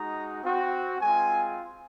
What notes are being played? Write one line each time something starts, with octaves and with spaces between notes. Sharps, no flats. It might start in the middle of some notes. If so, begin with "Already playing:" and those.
Already playing: G#3 D#4 F#4 A#5
C4 F#4
G#3 C4 F4 G#5